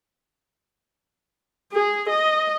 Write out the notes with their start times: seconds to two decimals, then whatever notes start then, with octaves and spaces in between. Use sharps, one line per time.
1.72 G#4
2.10 D#5